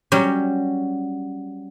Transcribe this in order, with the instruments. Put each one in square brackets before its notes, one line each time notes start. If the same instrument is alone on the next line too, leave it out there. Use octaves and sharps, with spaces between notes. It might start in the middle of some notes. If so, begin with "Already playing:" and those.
[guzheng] F#3 G3 C#4 G4